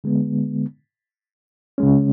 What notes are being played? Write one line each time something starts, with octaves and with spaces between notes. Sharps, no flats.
D3 G#3 B3
C#3 G#3 C#4